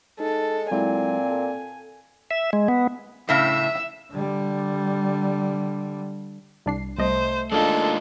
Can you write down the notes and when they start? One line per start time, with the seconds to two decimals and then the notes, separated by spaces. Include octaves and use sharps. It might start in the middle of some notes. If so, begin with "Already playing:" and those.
0.20 G#3 D#4 A4
0.71 A#2 F#3 G#3 C4 E4 G#5
1.31 A4
2.31 E5
2.53 G#3
2.68 B3
3.29 A2 C#3 E5
4.11 D3 G3
6.66 C2 D4 C7
6.98 C2 A3 C5 D#5
7.52 G#3 A#3 D4 D#4 F4 A4